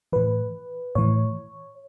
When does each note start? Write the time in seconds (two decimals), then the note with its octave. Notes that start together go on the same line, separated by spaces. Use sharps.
0.12 A2 E3 B4
0.95 A2 E3 C#5